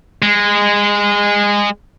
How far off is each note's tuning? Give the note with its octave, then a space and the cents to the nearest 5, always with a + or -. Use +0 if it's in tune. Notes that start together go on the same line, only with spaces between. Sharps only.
G#3 -20